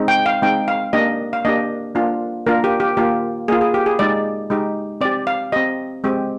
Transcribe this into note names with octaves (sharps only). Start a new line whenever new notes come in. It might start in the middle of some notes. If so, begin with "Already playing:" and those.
Already playing: G#3 C4 D#4
G5
F5
G#3 C4 D#4 G5
F5
A#3 D4 G4 D#5
F5
A#3 D4 G4 D#5
A#3 D4 F4
A#3 D4 F4 A#4
G4
G4
A#3 F4 G4
A#3 F4 G#4
G#4
G4
G#4
G#3 D#4 G4 D5
G#3 D#4 G4
C4 G4 D5
F5
C4 G4 D#5
G#3 C4 G4